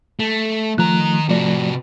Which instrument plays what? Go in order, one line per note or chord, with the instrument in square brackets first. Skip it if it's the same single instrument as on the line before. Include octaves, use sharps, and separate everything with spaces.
[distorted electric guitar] A3
[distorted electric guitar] D#3 A#5 [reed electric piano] F3 A3 F#6
[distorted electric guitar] C3 F#4 [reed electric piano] F3 A3 D5